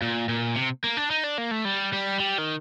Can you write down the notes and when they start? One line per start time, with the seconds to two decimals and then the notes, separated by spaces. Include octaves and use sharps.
0.02 A#2
0.29 A#2
0.56 C3
0.84 A#3
0.97 D4
1.11 D#4
1.24 D4
1.38 A#3
1.51 A3
1.65 G3
1.93 G3
2.20 G3
2.38 D#3